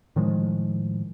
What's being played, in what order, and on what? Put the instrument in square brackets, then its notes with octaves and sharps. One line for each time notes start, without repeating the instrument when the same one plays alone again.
[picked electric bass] A2 D#3 F3 G#3